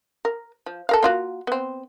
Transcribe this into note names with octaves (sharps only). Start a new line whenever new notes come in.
A#4
F3
A4 A#4 F5
A#3 F4 F#4
B3 C4